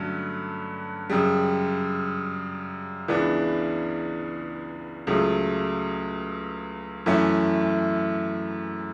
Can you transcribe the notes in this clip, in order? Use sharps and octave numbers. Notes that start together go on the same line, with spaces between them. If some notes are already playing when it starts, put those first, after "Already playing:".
Already playing: G2 D3 F#3 A3 C#4
F#2 C#3 G3
C#2 C#3 E3 B3 D4
C#2 C#3 F#3 A3
F#2 E3 A3 C#4 E4